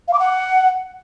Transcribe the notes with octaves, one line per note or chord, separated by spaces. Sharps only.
F5
D6
F#5